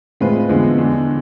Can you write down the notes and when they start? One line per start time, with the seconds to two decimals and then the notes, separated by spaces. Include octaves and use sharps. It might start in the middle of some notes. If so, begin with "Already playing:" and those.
0.20 A2 G#3 C4 F4 B4
0.49 E2 D3 F3 G#3
0.78 E2 D3 G#3 D4